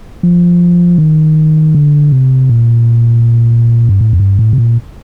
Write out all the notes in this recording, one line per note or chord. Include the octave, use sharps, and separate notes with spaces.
F3
D#3
D3
C3
A#2
G2
A2
F2
G2
A2
C3
A#2